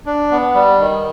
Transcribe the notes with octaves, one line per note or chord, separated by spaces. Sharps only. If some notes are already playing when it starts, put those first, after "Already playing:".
D4
B3
G3
D#3